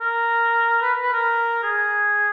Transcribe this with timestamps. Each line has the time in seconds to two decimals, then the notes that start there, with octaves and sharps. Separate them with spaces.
0.01 A#4
0.82 B4
1.03 B4
1.13 A#4
1.63 G#4